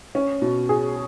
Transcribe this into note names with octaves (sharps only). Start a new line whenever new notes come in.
C#4
B2
G#4